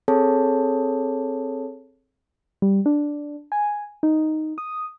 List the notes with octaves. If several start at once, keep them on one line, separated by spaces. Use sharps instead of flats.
C4 G#4 A4 C#5 A5
G3
D4
G#5
D#4
D#6